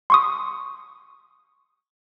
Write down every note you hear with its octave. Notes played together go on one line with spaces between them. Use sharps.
C6 C#6 D#6